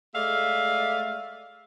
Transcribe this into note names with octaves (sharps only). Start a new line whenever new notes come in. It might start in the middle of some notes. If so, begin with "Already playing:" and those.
G#3 A3 D5 E5 F5